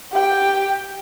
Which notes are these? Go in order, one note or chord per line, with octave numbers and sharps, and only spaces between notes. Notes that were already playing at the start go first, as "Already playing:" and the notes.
G4 G5